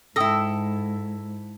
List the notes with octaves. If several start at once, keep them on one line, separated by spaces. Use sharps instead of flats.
G#2 E4 A4 G5 D#6 A#6